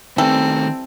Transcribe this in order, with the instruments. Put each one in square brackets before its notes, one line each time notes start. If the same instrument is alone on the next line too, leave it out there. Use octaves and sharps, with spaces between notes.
[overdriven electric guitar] D#3 A3 [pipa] E3 G3 A4 [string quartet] C4